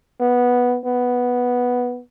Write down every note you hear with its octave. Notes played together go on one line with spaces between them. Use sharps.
B3
B3